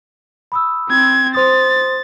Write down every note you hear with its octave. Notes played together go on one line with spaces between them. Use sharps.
B5 D#6 E6
C4 G#6
C5 C6 D#6 A6